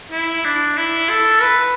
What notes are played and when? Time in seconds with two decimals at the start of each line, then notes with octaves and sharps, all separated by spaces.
0.12 E4
0.45 D4
0.78 E4
1.10 A4
1.42 B4